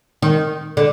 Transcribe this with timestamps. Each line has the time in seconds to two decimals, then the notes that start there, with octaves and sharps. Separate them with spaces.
0.22 D#3
0.77 D3